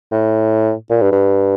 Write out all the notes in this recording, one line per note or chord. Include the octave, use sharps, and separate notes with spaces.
A2
A#2
G2
G2